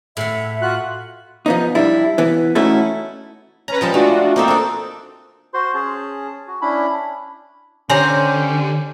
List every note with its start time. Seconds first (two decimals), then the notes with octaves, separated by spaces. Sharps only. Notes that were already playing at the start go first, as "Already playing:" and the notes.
0.17 A2 E5 F#5
0.62 F4 F#4 F#6
1.46 F3 B3 D#4
1.75 G3 D4 E4
2.18 E3 B3
2.55 A3 C#4 D#4 E4 F#4 A4
3.68 C#4 B4 A#5
3.81 F3 G3 G#3 A5
3.94 A3 D4 F4 F#4
4.36 A#3 C4 D#4 A4 E5
4.48 D4 D5
5.54 F#4 C5 C6
5.74 C#4 G#4 A5
6.47 F#4
6.62 C#4 D4 E4 B5
7.90 D3 C#4 G4 C5 C#5 G#5 A#5